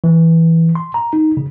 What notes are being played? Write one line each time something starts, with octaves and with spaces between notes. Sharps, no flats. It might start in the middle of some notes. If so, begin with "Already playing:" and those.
E3
C6
A#5
D#4
C#3